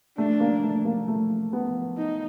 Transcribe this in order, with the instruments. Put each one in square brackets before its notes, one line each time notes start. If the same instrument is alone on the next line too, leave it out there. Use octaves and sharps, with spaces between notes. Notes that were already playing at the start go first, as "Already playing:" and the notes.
[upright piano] A3 [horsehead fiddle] D4
[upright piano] A#3
A3
A#3
A3
B3
[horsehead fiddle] D#4